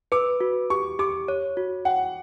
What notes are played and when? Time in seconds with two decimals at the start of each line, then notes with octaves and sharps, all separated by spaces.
0.12 B4 D6
0.41 F#4
0.70 G4 C#6
0.99 G4 D6
1.28 C#5
1.57 F#4
1.85 F#5 G5